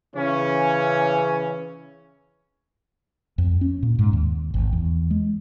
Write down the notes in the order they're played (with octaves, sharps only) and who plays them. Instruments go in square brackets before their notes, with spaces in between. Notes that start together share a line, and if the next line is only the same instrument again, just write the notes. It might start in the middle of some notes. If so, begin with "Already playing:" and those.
[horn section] C#3 E3 C#4
[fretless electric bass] F2
C#4
A#2
G#2
D#2
G#1
E2
G#3